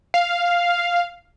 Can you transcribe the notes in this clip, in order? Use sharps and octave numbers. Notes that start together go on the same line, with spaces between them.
F5